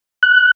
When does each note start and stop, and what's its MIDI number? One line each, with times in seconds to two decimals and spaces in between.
0.23 0.51 90